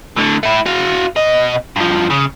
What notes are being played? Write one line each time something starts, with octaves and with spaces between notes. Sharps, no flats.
A2 D3
A3 E4
F#4 F5
B2 D#5
G2 F3
C#3